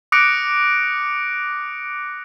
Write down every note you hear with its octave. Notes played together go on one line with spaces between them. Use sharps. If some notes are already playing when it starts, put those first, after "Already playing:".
D6 D#6 F#6 A#6 C#7 D7